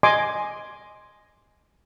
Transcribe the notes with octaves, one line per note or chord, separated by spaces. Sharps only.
D#5 G#5 C6 D6